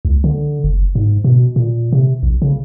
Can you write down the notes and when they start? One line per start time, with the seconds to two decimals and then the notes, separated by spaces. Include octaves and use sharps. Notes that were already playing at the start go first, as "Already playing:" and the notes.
0.05 C#2
0.24 D3
0.64 F#1
0.95 G#2
1.24 B2
1.56 A#2
1.92 C3
2.23 A#1
2.42 C#3